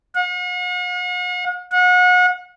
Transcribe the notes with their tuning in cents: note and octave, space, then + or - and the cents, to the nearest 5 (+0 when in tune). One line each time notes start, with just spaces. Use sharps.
F#5 -45
F#5 -35